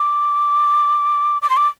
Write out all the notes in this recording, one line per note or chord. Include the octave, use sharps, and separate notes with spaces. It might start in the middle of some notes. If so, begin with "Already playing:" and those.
Already playing: D6
D6
C6
D6